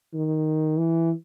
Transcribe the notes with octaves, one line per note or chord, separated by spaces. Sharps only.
D#3
E3